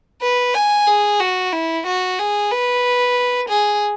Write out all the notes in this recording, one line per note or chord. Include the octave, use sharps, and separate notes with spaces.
B4
G#5
G#4
F#4
E4
F#4
G#4
B4
G#4